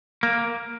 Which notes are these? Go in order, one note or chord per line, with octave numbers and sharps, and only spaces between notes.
A#3